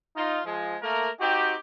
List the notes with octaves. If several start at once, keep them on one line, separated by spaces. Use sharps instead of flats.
D#4 F4
F3 G#3
A3 A#3 A#4
C4 D#4 F#4 G4